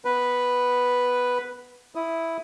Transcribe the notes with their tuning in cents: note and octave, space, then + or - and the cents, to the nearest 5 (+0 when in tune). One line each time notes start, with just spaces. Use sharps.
B3 +0 B4 +0
E4 +0 D#6 +10